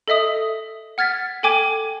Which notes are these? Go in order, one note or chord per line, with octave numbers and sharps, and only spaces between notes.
A4 D#5 E5 D#6
F#5 F6 G#6 A6 B6
A4 G5 G#5 D6 G#6 D#7